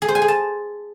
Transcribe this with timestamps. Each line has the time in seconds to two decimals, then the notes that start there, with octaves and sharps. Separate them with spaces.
0.02 G#4
0.08 C5
0.15 G#5
0.22 G#4
0.28 A5